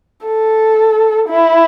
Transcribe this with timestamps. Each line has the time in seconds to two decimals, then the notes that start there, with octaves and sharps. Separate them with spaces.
0.26 A4
1.29 E4